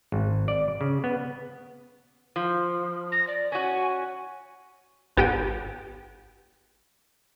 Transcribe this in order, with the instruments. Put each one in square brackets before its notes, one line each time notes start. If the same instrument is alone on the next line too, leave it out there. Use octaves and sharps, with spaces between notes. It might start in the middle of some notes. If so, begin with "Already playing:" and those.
[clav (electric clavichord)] G#1
D5
C#3
B3
[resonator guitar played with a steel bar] F3
[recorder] A#6
D5
[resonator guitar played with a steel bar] C#4 F#4 [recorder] G#5
[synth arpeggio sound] G#1 B3 G4 A4 G5 D#7